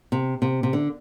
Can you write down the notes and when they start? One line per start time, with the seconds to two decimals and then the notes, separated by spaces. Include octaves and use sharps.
0.12 C3
0.42 C3
0.63 C3
0.73 D3